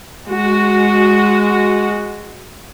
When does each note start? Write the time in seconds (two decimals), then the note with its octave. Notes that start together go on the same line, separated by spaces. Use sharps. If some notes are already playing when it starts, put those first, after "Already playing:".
0.28 G#3 F#4